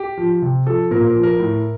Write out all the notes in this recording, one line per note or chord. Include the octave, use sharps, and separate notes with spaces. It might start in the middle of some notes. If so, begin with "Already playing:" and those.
Already playing: G4
F3
C3
F3 A4
A#2 A#4
A#4
F3
A#4
A2